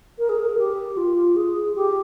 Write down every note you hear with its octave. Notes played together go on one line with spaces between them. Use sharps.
A#4
G#4
A#4
G4
F4
G#4
G4